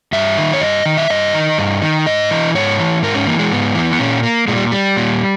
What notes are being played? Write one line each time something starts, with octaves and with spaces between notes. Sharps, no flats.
G2 E5
D#3
C#5
G2 D#5
D#3
E5
G2 D#5
D#3
G2
D#3
G#2 D#5
E3
G#2 C#5
E3
G#2 A#4
C#4
E3 A#3
G#3
G#2 B3
E3
B3
A#2 C#4
A#3
A#2 G#3
G3
G3
A#2